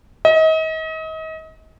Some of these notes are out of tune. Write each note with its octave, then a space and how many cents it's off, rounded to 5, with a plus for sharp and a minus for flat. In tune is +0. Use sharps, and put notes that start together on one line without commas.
D#5 +35